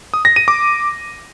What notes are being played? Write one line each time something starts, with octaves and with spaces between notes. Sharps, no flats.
D#6
A#6
D#7
D6